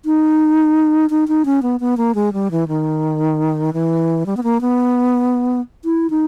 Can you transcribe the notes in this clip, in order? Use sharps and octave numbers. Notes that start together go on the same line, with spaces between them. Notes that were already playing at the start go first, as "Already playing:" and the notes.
D#4
D#4
D#4
C#4
B3
B3
A#3
G#3
G3
E3
D#3
E3
G3
B3
A#3
B3
E4
D#4